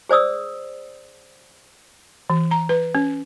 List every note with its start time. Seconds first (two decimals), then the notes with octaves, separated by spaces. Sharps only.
0.09 G#4 C5 D5 D#6 E6
2.30 E3
2.51 A#5
2.69 B4
2.95 C#4